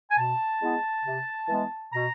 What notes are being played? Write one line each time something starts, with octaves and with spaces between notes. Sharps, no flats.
G#5
B2 A5
G#3 B3 E4
C3
E3 G#3 B3
B2 A#5